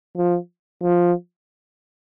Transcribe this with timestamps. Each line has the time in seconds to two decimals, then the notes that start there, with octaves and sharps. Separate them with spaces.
0.17 F3
0.82 F3